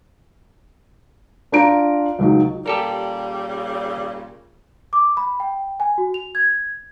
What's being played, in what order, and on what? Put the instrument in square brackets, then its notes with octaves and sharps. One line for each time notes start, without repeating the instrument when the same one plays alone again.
[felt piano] D4 F4 A#5 D7
C#2 F#3 D#4
[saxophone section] A#2 C#3 G3 [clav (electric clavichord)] G4 A4 A#4
[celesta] D6
B5
G5
G#5
F#4
F7
G#6